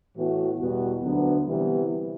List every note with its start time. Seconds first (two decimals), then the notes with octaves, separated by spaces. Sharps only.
0.15 A2 E3 B3 F#4
0.59 E2 B2 G3 B3 F#4
1.03 D2 D3 F#3 B3
1.46 C3 E3 G3 B3